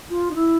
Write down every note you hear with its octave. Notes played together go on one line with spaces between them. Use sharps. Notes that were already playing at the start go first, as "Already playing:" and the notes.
F4
D#4
E4